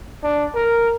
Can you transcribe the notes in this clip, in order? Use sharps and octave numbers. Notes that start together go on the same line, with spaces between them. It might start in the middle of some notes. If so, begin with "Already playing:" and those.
D4
A#4